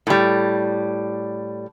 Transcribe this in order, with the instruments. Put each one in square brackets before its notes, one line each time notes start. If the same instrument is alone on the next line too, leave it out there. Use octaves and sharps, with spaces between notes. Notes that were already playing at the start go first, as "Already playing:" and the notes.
[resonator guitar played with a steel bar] A2 G3